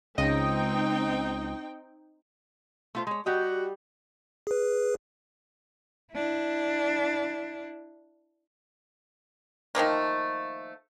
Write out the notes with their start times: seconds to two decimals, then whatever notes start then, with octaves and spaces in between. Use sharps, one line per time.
0.18 C#2 C4 D#4 D#5 G5
2.95 A3 F4 C5
3.07 G#3 C#5
3.26 G3 F#4 G4 D#5
4.47 G#4 B4
6.12 D4 E4
9.75 D#3 F3 A3 A#3